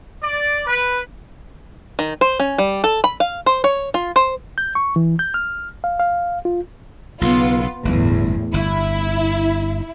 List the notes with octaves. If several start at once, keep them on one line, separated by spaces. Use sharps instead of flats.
D5
B4
D#3
C5
C#4
G3
A4
B5
F5
C5
C#5
F4
C5
G6
C#6
E3
G6
F6
F5
F5
F4
B1 C#3 B3 F4
G1 E2 A2
G1 E4